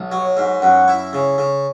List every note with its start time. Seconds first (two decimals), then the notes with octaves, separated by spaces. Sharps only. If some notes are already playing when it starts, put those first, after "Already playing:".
Already playing: B1
0.11 F#3 C#5
0.37 G#2
0.62 F#2 F#5
0.88 E4
1.13 C#3
1.38 C#3